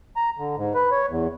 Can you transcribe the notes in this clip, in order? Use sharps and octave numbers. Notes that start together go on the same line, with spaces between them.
A#5
D3
G#2
B4
C#5
E2